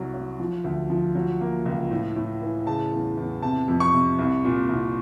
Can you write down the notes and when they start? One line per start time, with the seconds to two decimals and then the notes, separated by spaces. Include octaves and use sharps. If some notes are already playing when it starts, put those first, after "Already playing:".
Already playing: C2 F#3
0.14 F#3
0.39 F3
0.64 D2
0.90 F3
1.15 F#3
1.41 A#3
1.65 C#2
1.91 A2
2.16 A2
2.41 E3
2.66 C#3 A5
2.92 E2
3.17 E2
3.43 C3 A5
3.68 F2
3.80 C#6
3.93 C3
4.18 C2
4.44 A#2
4.69 C2